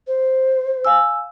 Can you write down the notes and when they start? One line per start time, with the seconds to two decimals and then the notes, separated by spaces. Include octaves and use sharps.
0.07 C5
0.85 F5 G#5 E6